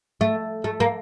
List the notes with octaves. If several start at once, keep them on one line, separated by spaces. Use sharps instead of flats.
A3
A3
A#3